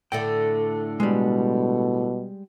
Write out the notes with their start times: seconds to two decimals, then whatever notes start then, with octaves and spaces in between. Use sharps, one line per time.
0.12 A2 D3 A3 G5
1.00 B2 G3 G#3